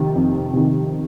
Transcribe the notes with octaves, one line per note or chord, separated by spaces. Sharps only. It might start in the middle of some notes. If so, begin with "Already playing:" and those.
Already playing: F2 C3 D#3
F2
C3 D#3